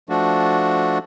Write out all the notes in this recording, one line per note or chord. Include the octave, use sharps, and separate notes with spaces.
F3 A3 D4 F#4